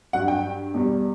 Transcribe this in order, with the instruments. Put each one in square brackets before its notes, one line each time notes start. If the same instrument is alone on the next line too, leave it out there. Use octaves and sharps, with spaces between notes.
[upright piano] G2 F#3 F#5
G5
E2 B2 G3